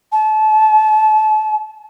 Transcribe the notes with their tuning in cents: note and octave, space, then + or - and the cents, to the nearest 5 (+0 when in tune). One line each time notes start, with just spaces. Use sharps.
A5 -30